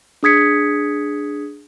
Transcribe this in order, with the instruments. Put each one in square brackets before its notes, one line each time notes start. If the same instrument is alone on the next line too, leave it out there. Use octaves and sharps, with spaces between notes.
[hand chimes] D4 G#4 D#6 G#6 B6 C#7